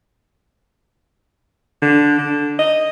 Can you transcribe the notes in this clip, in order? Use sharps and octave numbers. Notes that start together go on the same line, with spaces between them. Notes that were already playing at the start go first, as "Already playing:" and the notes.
D3
D3
D#5